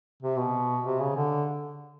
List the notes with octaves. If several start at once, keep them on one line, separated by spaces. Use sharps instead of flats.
C3
B2
C3
C#3
D3